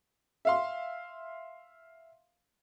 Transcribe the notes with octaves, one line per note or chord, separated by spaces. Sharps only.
E5 F5 C6